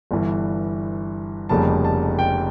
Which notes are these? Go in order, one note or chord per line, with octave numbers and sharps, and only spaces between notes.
G1 G2 E3
F1 F2 C#3 G3 A#3 A5
A5
G5